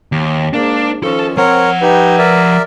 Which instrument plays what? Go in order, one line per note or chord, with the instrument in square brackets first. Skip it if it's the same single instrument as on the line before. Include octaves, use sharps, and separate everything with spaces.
[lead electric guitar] D#2
[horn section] G#2 A#3 [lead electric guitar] D4
[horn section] D#3 F3 C#4 [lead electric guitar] A4
[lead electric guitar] F3 F#5 [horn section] C4 [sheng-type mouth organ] A#4 C#5
[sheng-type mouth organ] D#4 G4 [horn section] B4
[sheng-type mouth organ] A#4 D5 E5